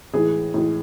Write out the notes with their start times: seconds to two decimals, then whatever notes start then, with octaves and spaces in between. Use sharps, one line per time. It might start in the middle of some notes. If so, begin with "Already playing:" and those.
0.13 A2 E3 G#3 G#4
0.54 A2 E3 G#3